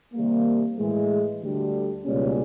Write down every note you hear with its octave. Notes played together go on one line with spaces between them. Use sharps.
C3 D#3 G3 A#3
A2 E3 G#3
D2 D3 G3
C#2 B2 G3 A#3 C#4